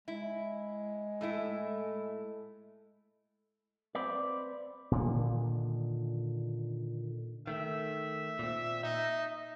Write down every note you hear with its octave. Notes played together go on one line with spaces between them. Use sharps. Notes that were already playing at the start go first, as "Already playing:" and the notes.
G#3 E4
A2 A3 E4
C4 B4 D5
A#2 D3 D#3
D#3 A3 E5
A#2 C4
D#4 E5